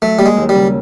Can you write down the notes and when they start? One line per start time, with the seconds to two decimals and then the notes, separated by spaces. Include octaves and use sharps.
0.02 F#3 A3
0.19 G3 A#3
0.26 G#3
0.37 D#2
0.49 G3
0.55 C#3